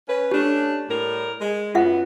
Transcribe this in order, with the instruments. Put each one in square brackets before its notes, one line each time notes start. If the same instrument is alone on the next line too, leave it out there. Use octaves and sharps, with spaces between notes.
[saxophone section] C#4 B4
[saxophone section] A3 C#4 D4 [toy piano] G4
[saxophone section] A2 G3 A#4
G#3
[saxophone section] F#2 B3 [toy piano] F4 E5 F#5